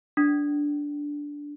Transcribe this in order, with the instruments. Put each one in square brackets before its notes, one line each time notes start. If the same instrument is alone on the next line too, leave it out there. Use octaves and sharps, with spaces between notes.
[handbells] D4